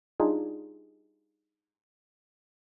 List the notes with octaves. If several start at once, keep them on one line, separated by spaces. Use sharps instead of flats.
G3 D4 D#4 F4 G#4